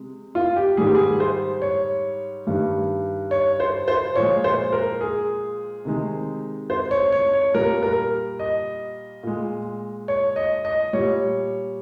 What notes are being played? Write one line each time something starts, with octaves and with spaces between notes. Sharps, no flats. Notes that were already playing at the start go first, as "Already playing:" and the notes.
Already playing: C3 G#3
F4
G4
G#2 D#3 G3 G#4
G4
G#4
C5
C#5
G2 D#3 G3
C#5
C5
C5
A#2 F3 G#3 C#5
C5
A#4
G#4
C3 D#3 G#3
C5
C#5
C#5
C#5
A#2 G3 A#4
A#4
D#5
A#2 G#3
C#5
D#5
D#5
A#2 G3 C#5